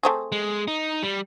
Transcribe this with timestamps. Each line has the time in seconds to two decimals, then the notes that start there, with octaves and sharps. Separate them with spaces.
0.03 A3 C4 G#4
0.32 G#3
0.68 D#4
1.03 G3